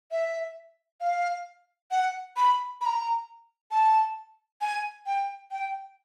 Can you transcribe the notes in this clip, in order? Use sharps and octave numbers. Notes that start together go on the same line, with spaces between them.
E5
F5
F#5
B5
B5
A#5
A5
G#5
G5
G5